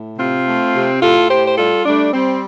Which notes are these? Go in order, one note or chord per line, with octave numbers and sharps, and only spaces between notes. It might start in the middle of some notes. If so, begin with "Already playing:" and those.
Already playing: A2
C3 C4 F4
A3
C3
A2 F4 A4
A2 G4 C5
C5
G3 F4 A4
G3 A3 D4
G3 C4